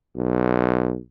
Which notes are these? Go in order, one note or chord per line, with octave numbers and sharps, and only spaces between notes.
B1